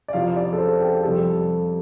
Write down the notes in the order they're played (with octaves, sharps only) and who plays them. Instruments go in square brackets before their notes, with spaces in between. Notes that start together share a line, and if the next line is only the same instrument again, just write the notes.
[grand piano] D5
F2 C3 F3 F5
D5
A4
C5
G4
F2 C3 G3 A4